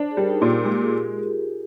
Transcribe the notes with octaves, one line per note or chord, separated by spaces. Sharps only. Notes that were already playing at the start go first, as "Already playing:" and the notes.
Already playing: D4 C5
G#4
G3 A#4
D#4
A#2 F4
F4
G#3 G4
A#4
G#4